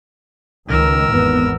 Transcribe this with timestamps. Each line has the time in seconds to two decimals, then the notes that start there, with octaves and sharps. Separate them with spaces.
0.69 C#2 D#3 A#4 E6
1.09 G#1 E2 B3